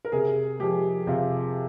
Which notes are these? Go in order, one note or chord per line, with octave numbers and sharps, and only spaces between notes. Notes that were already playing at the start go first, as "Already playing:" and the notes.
A#4
C3 G#4
F3 G#3 G4
C3 F4